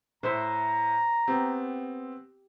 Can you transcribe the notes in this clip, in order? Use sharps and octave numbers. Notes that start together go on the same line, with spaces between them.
A2 C5 E5 A#5
B3 C4 G4